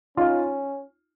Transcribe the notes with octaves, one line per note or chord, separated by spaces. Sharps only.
C#4 D#4 F4